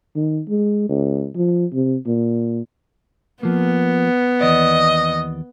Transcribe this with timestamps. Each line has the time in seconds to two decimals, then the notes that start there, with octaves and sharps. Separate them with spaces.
0.15 D#3
0.48 G#3
0.89 C#2
1.35 F3
1.73 C3
2.07 A#2
3.43 F3 A#3 B3
4.41 D#2 E3 D5 D#5